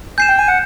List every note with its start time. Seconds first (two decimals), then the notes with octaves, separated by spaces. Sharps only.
0.18 G#5 G6 C7 E7
0.28 G5
0.38 G#5
0.48 F#5